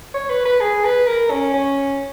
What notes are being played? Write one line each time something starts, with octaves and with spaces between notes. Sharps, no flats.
C#5
B4
B4
G#4
B4
A#4
C#4
C#4